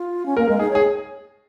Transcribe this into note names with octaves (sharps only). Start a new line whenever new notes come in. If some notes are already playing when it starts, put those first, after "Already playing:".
Already playing: F4
C#4
A#3 A#4
G#3 A#4
D#4 G#4
G#4 C#5